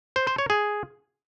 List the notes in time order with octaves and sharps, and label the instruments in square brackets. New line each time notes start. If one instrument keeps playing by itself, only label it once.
[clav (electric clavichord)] C5
C5
C#5
G#4